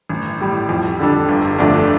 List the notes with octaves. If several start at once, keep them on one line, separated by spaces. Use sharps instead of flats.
A1
A2 G3
F2
D3 G3 D4 A4
G1
F2 D3 A3 D4